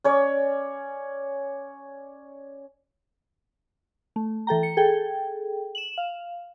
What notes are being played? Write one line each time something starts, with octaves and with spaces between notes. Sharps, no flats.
C#4 C#5 D5
A3
E3 A4 G5 A#5
C#7
G#4 A4 G5
E7 F#7
F5